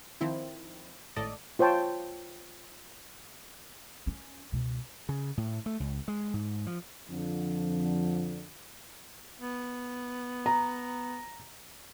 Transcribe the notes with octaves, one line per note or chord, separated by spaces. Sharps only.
D#3 F3 C4 E4
G#1 A2 A4 D5 D#5
F4 C5 C#5 G5 A5 C6
C#4
C#2 B2
C#3
A2
A3
C#2
G#3
G#2
F3
F2 D3 F3
B3
A#5